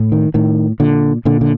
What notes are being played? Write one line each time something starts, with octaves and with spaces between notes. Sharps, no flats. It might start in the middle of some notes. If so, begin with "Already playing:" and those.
Already playing: A2
D#3
A2 D#3
A#2 D3
A#2 D3
D3